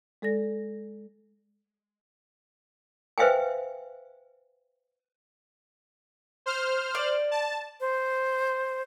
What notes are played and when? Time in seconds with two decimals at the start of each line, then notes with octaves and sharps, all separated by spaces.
0.22 G#3 A4 D5 A#6
3.18 B4 C5 E5 F5 G5 G#5
6.46 C5 F6
6.95 D5
7.31 A5
7.80 C5